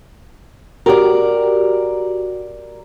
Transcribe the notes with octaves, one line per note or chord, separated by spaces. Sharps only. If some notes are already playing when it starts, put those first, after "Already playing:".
F#4 G4 A#4 D5